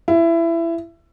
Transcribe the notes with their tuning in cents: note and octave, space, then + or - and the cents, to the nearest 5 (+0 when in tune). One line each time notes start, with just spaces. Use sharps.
E4 +20